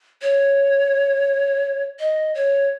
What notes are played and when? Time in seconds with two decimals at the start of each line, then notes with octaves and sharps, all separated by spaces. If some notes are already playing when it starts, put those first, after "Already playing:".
0.22 C#5
2.00 D#5
2.35 C#5